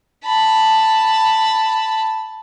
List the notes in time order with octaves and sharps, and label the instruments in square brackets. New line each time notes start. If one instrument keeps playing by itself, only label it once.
[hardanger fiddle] A5 B5